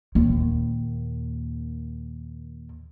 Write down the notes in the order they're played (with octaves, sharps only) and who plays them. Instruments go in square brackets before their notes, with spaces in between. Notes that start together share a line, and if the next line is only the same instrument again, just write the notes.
[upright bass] D#2 A#2